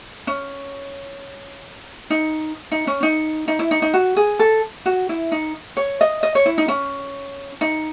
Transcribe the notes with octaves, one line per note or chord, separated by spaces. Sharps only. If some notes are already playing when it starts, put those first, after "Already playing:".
C#4
D#4
D#4
C#4
D#4
D#4
E4
D#4
D#4
F#4
G#4
A4
F#4
E4
D#4
C#5
D#5
D#5
C#5
E4
D#4
C#4
D#4